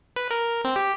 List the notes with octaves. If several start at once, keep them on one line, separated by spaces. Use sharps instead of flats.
B4
A#4
C4
G4